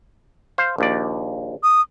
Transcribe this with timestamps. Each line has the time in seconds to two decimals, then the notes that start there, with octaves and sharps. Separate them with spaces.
0.58 C5 F5
0.78 A#1 D#2 D5
1.63 D#6